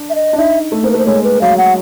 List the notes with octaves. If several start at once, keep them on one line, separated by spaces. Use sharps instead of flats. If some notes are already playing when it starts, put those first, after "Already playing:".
Already playing: D4
E5
D#5
D4
D#4 E5
A3
A#3 C5
B4
A3
C5
G#3 C#5
B4
F#3 F5
F#5